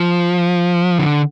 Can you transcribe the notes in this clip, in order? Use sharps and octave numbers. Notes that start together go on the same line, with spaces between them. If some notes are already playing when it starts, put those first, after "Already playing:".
Already playing: F3
D3